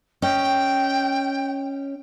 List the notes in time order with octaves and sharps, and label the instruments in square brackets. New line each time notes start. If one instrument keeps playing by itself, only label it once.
[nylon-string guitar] C#4 D#5 [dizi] G5